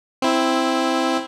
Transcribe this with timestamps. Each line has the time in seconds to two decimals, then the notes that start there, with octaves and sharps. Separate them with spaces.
0.22 C4 E4